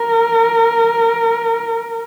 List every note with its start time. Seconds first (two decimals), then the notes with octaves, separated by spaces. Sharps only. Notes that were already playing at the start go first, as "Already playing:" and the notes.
Already playing: A#4